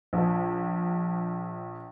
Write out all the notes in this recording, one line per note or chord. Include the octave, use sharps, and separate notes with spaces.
A#1 F3